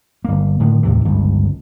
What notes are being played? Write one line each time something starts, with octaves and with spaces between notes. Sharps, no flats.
G1 A#3
A2 D3 D#3
D#2 A2 C3 E3
G1 C#2 G2